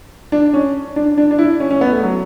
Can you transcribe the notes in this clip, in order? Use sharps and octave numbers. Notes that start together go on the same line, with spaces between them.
D4
C#4
D4
D4
D4
E4
C#4
C#4
B3
A3
F#3